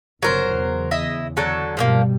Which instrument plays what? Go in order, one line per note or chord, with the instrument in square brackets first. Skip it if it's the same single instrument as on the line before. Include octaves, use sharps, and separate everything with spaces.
[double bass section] G1 C#3 [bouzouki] F#3 A#4 C5
[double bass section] E2 C#3
[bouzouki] E4 D#5 E5
D3 F#3 A4
[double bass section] G2 B2 G3 [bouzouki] F3 G#3 A#3